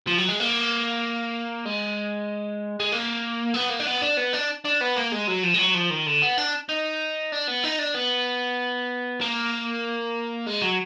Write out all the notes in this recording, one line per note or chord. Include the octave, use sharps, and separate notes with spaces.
F3
F#3
G#3
A#3
G#3
G#3
A#3
B3
A#3
D4
B3
D4
B3
D4
D4
B3
A#3
G#3
F#3
F3
G#3
F#3
F3
D#3
D3
B3
D4
D#4
D4
B3
D#4
D4
B3
A#3
G#3
F#3